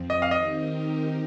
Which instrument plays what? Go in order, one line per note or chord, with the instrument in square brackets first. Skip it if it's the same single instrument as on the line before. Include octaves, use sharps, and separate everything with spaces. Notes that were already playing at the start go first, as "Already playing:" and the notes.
Already playing: [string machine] F2 F3 C4
[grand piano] D#5
F5
[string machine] D#3 C4 D#4 G4 A#4 [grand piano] D#5